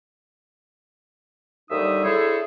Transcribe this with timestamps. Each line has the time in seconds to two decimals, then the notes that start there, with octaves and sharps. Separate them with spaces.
1.70 D#2 D3 G3 D#4 E5 D#6
2.04 D3 E4 G#4 A4 C5 C#5